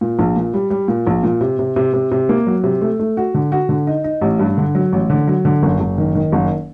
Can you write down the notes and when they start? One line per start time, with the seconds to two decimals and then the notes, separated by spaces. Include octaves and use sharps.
0.01 A#2
0.19 A#1
0.36 A#2
0.54 G3
0.70 G3
0.88 A#2
1.07 A#1
1.23 A#2
1.41 C3
1.59 C3
1.76 C3
1.93 C3
2.11 C3
2.29 A#3
2.47 F#3
2.64 C3
2.81 A3
2.99 A3
3.17 F#4
3.34 D3
3.52 F#4
3.69 D3
3.87 D#4
4.04 D#4
4.21 A1
4.39 G2
4.58 D3
4.75 F#3
4.92 A1
5.10 D3
5.27 F#3
5.45 D3
5.62 F#1
5.80 F#1
5.98 D#3
6.15 D#3
6.32 F#1